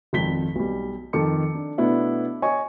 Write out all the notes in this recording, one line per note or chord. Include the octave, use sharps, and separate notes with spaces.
G#1 F2 B6 G7
B1 G3
F2 D#3 A4 D6 C#7
D4
B2 A3 B3 D4 E4 E5
C#5 D#5 G#5 C#6